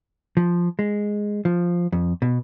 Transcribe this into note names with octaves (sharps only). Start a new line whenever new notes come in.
F3
G#3
F3
F2
B2